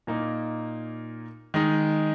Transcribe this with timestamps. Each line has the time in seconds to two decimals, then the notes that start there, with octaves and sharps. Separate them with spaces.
0.07 A#2 A#3 D#4
1.54 D#3 G#3 D#4